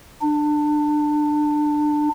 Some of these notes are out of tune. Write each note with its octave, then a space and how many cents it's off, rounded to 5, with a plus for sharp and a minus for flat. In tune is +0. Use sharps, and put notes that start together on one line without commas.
D4 +25